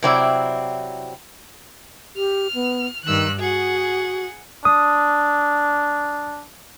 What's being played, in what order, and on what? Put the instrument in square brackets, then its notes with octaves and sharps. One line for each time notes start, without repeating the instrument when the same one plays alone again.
[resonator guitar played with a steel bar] C3 F#3 C4 E4 D5
[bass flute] G4 [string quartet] F6
[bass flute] B3
[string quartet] G2 E6 F#6 [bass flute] D#3
[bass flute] F#4 [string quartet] G#4 F#5
[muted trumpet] D4 [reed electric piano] D#6